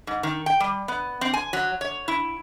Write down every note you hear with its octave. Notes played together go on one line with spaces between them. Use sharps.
G#2
D#3
G5
G3
B3
C4
G#5
F#3
C#5
E4